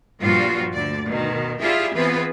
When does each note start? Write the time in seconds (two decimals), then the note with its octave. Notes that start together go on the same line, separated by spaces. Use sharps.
0.20 G2 A#2 F3 G3 F4 F#4
0.73 D2 D3 D5
1.06 B2 D#3
1.60 E4 F4 G4 G#4 D5 E5
1.95 E3 B3 C4 F4 G#4 B4